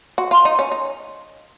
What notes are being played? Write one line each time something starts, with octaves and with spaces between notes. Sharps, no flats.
F#4
F4
D#4
C#4
D#4